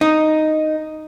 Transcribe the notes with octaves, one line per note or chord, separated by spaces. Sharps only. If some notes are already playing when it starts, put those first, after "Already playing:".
D#4